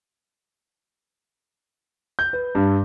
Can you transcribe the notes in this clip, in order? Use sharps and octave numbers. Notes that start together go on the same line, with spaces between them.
G6
B4
G2